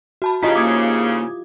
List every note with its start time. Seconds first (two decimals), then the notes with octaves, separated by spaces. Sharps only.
0.22 F#4 A5 B5
0.43 G#2 C#3 E4 F4 G4 D#5 A#5 B6
0.55 A#3 D6 D#6 G#6